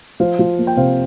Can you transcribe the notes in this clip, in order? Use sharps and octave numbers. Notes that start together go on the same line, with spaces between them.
F3 C5 F5
F3
A#3
G5
C3 C5 F5